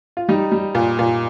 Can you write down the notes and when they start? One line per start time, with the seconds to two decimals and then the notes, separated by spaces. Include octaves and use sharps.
0.17 F4
0.29 G3 D#4
0.52 G3
0.75 A#2
0.99 A#2